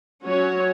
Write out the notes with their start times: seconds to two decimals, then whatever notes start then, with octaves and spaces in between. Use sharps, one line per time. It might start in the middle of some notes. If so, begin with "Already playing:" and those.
0.22 F#3 C#4 F#4 C#5